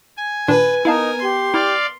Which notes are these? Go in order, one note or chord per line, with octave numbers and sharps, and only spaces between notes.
G#5
A#2 D#3 D4 B4
B3 D#4 E4 A#4 F5 A5
G4 C6
E4 D5 F5